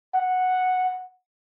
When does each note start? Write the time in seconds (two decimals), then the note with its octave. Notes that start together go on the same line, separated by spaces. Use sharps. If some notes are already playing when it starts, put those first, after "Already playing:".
0.15 F#5